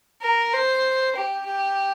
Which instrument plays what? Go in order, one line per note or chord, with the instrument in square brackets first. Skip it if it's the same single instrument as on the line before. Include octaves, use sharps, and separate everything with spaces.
[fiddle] A#4
C5
G4
G4